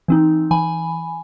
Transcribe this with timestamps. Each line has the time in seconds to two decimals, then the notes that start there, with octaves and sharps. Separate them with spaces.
0.08 E3 C4 D#4
0.51 E3 G#5 B5